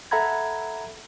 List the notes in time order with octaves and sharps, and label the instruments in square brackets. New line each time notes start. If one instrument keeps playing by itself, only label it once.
[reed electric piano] A4 E5 F#5 A#5 B5 G#6